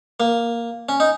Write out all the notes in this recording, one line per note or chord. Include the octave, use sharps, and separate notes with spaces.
A#3
C#4
D#4